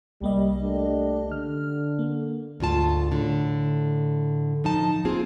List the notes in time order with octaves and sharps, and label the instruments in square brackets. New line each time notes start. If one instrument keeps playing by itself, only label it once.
[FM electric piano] C2 A#3 D#5 [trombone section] G3
[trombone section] A3 D4 G4
[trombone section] D3 [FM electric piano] F6
[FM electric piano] A#3
[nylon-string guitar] D2 G#2 F4 A5
A2 D3
F3 D#4 A5
A#3 C4 F4 G#4